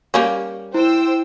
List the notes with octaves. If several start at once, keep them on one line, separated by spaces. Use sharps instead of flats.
G3 A#3 C#4
E4 C5 G5 E6